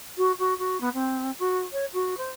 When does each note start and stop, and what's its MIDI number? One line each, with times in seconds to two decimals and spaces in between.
0.18 0.32 66
0.39 0.57 66
0.58 0.80 66
0.81 0.89 59
0.94 1.31 60
1.39 1.60 66
1.72 1.85 73
1.94 2.14 66
2.18 2.31 72